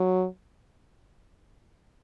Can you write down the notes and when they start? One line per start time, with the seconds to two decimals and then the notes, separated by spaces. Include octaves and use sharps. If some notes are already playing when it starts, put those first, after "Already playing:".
Already playing: F#3